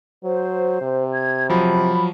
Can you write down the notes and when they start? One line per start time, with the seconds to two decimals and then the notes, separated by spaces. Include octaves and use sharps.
0.24 F#3 C5
0.81 C3
1.13 G#6
1.50 F3 F#3 B5